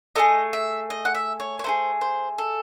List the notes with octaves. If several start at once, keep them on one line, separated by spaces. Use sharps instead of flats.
A3 D#4 G#4 D#5
E5
D#5
F#5
E5
C#5
C#5
A3 D#4 G#4 C5
C5
A4